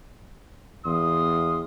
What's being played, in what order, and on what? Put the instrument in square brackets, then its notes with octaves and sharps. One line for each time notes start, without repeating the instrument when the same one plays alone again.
[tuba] E2 [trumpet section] F5 C6 D#6